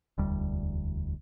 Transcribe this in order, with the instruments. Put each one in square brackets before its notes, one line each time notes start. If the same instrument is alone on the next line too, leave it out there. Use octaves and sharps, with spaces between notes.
[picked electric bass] E1 D2 G3